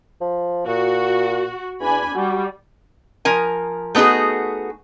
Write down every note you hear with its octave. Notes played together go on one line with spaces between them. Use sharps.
F3
A#2 F#4
E2 D4 G#5 B5
G3 F#4
F3 A#4 G#5
A3 B3 D#4 F#4 G#4